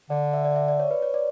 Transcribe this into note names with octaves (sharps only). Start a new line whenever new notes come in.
D3 D5
E5
D5
E5
D5
C#5
B4
C#5
D5